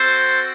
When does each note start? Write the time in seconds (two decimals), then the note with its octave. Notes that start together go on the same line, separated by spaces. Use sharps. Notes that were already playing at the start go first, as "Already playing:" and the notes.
Already playing: C4 F#4 A4 C5